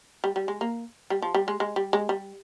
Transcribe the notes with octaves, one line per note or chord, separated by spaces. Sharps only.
G3
G3
G#3
A#3
G3
F3
G3
G#3
G#3
G3
G#3
G3